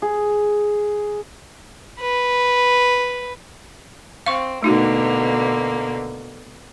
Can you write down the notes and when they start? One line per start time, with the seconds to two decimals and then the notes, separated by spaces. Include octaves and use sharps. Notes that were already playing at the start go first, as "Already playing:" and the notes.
0.02 G#4
2.00 B4
4.26 C4 F5 C#6
4.63 B2 D3 A3 A#3 D#4 F#4